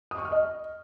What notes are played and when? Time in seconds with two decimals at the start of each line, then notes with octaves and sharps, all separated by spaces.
0.11 D#6
0.18 C#6
0.25 F6
0.32 D#5